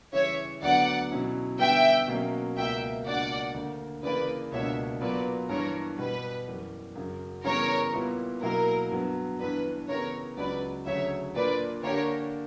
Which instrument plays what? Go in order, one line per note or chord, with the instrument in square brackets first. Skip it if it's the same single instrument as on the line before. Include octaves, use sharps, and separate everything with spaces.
[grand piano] C#3 E3 G3 [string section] C#5 E5
[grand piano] D2 D3 F#3 B3 [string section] D5 F#5
[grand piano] B2 F#3 C#4 E4
[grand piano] D3 G3 B3 [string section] E5 G5
[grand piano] B2 F#3 A#3 C#4
[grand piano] C#2 B2 A#3 [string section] E5 G5
[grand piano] C#2 B2 A#3 D4 F#4 [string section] D5 F#5
[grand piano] D2 D3 A#3
[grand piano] C#3 E3 A#3 [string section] B4 D5
[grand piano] C#2 B2 A#3 D4 [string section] C#5 E5
[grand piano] A#2 F#3 B3 F#4 [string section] B4 D5
[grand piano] G2 E3 G3 [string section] A#4 C#5
[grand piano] B2 G3 B3 [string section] B4
[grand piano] F#2 E3 G3
F#2 C#3 F#3
[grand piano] C#3 E3 G3 B3 [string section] A#4 C#5
[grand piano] A#2 G3 B3 E4
[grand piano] B2 F#3 A#3 E4 [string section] A#4
[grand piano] G2 F#3 B3
[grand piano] G2 E3 B3 D4 [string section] B4
[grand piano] C#3 E3 B3 E4 G4 [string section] A#4 C#5
[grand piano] C#2 C#3 F#3 C#4 [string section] B4 D5
[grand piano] D2 C#3 F#3 [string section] C#5 E5
[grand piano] A#2 A#3 D4 [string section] B4 D5
[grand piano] D3 A#3 D4 G4 [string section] A#4 C#5